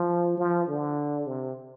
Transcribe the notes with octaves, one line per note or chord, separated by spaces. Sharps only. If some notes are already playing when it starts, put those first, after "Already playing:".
Already playing: F3
F3
D3
C3